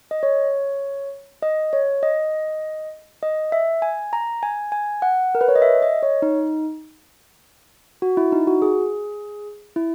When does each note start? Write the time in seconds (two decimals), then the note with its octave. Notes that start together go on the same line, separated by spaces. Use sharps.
0.11 D#5
0.23 C#5
1.42 D#5
1.73 C#5
2.03 D#5
3.23 D#5
3.52 E5
3.82 G#5
4.13 A#5
4.43 G#5
4.72 G#5
5.02 F#5
5.35 A#4
5.41 B4
5.48 C#5
5.56 D#5
5.62 E5
5.82 D#5
6.03 C#5
6.22 D#4
8.02 F#4
8.17 E4
8.32 D#4
8.47 F#4
8.62 G#4
9.76 E4